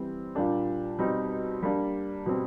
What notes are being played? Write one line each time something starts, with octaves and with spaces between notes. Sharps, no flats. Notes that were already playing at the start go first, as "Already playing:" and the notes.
Already playing: E3 G3 C4
A#2 G3 A#3 D4 G4
B2 G3 C4 D#4
G3 A#3 D4
B2 G3 C4